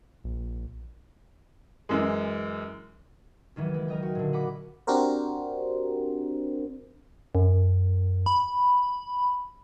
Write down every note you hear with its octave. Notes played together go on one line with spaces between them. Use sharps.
A#1
F#2 E3 G#3
C#2 D#3 E3 F#3
G#3
A#4 D#5 G5
F#4
A#2 D3
D#5 F#5 B5 D6
C4 D4 F#4 G4 A#4 C5
F#2
B5